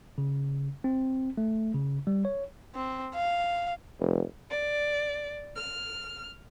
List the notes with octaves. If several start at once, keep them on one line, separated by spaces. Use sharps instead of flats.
C#3
C4
A3
C#3
G3
C#5
C4
F5
F1
D5
F6